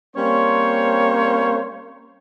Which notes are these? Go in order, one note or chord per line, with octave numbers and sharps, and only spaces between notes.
G3 A#3 C4 C#4 C5 C#5